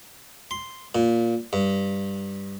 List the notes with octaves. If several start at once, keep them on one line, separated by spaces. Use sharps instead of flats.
C6
A#2
G2